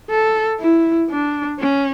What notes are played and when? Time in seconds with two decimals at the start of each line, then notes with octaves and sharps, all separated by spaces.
0.10 A4
0.60 E4
1.10 D4
1.60 C#4